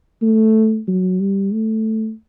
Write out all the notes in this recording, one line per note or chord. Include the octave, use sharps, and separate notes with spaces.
A3
F#3
G3
A3